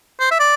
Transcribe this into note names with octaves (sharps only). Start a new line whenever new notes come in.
C5
E5
D5